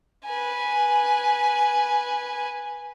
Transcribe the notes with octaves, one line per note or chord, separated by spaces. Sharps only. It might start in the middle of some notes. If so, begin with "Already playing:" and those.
B4 G#5